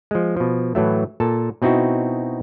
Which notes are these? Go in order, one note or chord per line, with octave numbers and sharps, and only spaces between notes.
F3 G#3
B2 F3
A2 E3 F#3 A3
A#2 A4 A5
B2 C4 D#4 E4 F#4